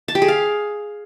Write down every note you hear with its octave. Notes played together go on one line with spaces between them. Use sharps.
A5
G4
G#4
F5